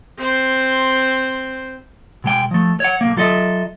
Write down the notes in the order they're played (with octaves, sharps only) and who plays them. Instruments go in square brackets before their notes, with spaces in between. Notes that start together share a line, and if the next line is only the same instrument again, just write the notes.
[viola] C4 C5
[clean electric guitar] B2 G#3 G5
F3 A3
C#5 F#5
B1 A#3
F#3 F4 A4 D#5 E5